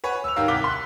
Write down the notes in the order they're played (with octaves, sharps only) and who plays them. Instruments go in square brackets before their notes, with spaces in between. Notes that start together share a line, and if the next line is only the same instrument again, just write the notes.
[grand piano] B4 C#5 F#5 G#5
E6 F7
G#2 D#3 G4 A#4 F5
C2 F#5 D6 F6 B6 G7
C6 F#6